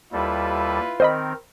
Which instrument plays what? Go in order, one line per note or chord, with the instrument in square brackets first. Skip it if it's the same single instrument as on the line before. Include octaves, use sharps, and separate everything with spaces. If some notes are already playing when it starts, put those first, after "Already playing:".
[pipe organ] D#2 G3 A4 [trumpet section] E4 F4 B4
[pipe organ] D#3 C4 A#4 [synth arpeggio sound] C5 D#5 B5